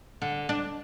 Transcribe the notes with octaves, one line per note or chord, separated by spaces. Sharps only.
D3
D4